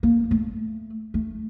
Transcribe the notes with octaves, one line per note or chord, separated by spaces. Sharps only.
A#3
A3
A3